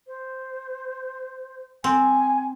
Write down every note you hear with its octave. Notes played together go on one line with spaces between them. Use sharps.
C5
C4 G#5